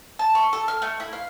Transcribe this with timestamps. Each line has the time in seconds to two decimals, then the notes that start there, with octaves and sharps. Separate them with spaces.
0.19 A5
0.35 C#6
0.53 A4
0.68 F6
0.82 A3
1.00 E4
1.13 F5